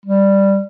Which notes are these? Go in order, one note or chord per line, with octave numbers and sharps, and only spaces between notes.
G3